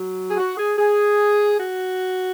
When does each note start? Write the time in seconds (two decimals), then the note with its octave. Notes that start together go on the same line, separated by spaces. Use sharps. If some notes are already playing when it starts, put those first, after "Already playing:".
Already playing: F#3
0.28 G#4
0.37 F#4
0.57 G#4
0.78 G#4
1.58 F#4